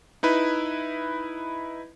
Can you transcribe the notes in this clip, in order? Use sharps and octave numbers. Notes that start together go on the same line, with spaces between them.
D#4 E4 B4